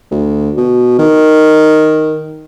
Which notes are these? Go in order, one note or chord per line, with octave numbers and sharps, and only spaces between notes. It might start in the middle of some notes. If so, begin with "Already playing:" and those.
D2
B2
D#3